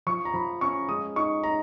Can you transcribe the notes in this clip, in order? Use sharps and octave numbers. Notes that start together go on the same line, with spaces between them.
F3 C#6
A#5
F3 B5
C#4 C#6
G#3 D#6
D#4 C#6
D#4 A#5